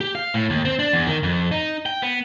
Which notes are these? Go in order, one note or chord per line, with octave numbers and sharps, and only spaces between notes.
G4
F5
A2
D#2
C4
D4
E2
D#3
F2
D#4
G5
B3